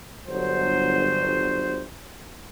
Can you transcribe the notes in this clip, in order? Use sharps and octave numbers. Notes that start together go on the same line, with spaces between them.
G1 F#3 C5